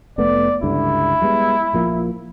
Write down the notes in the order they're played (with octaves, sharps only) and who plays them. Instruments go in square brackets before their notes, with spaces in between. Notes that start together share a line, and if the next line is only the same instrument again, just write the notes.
[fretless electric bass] F1 A3 B3 [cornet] D5
[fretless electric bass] C#2 G2 D3 [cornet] E4
[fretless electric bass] G3 G#3 B3
A#1 F3 A#3